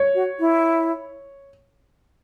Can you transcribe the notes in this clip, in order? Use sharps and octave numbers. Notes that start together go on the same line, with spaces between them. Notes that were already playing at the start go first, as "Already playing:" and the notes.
Already playing: C#5
F#4
E4